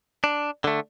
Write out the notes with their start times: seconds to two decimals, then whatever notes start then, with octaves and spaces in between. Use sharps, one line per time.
0.24 D4
0.64 D3 A3